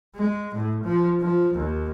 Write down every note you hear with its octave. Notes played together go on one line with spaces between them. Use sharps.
G#3
A2
F3
F3
D#2